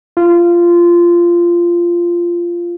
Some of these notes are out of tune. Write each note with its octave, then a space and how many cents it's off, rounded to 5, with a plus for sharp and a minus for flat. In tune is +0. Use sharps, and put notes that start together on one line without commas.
F4 -15